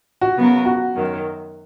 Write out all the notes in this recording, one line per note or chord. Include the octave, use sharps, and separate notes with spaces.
F#4
C#3 F#3 B3 F#4 A#4
F#4
F#2 D#3 F#3